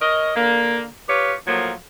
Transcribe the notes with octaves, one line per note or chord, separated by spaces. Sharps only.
A#4 C#5 D#5
D3 A#3
F4 G4 B4 C#5
A2 F3 F#3 A#3